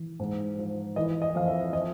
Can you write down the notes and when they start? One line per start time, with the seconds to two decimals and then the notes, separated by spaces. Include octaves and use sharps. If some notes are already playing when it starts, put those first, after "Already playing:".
Already playing: E3
0.20 G#2
0.58 F3
0.96 E3 D#5
1.22 D#5
1.35 F2 F5
1.48 E5
1.73 F3 D#5